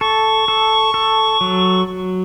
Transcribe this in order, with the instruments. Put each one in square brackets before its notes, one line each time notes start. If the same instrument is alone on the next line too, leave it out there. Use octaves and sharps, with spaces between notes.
[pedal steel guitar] A4 [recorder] C#6
[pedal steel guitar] A4
A4
F#3